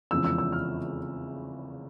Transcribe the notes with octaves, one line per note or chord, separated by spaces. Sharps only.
F1 E2 C#3 F3 G#3 E6
E6
E6
F6